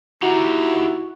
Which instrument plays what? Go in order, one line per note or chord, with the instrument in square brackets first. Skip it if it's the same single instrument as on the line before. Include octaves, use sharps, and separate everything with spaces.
[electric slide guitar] D#4 G4 A#5 [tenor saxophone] E4 [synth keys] F#4